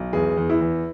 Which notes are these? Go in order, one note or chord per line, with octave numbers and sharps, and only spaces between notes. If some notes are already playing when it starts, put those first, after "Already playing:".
Already playing: B1
E2 G#4
E2
E4
E2